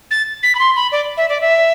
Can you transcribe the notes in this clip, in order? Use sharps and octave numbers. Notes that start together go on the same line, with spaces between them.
A6
B6
B5
C6
B5
D5
E5
D5
E5